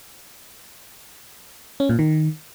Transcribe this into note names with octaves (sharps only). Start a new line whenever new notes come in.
C#4
A#2
D#3